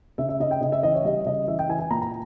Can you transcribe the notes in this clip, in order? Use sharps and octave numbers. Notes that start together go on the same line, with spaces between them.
C#3 E5
E5
C#3 D#5
G5
C#3 D#5
E5
E3 D#5
C#5
G3 D#5
C#3 D#5
E3 E5
G5
E3 G#5
G#5
A#2 A#5
A#5